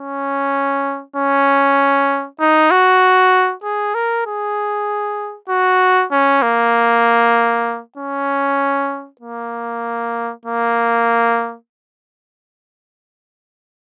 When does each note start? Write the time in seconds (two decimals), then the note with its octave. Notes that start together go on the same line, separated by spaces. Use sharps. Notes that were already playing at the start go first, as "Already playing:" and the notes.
Already playing: C#4
1.16 C#4
2.40 D#4
2.71 F#4
3.64 G#4
3.95 A#4
4.26 G#4
5.49 F#4
6.12 C#4
6.42 A#3
7.98 C#4
9.21 A#3
10.45 A#3